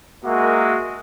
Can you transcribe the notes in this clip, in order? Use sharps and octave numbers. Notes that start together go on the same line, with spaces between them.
G#3 A#3 F#4 A#4 E5